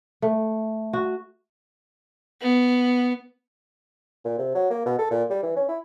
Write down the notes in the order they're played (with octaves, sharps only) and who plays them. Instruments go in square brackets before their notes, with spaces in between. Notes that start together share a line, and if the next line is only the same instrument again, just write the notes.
[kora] A3
F#4
[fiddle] B3
[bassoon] A#2
C3
F#3
A#3
B2
A4
A#2
G3
E3
C#4
E4